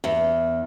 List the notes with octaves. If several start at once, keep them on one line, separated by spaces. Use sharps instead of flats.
E2